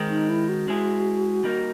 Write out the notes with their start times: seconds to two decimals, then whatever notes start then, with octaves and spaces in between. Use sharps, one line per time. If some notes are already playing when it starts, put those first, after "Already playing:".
Already playing: D#3 G#3 C4
0.10 D#4
0.30 E4
0.49 F#4
0.68 G#3 C4 E4 G#4
1.44 G3 A#3 D#4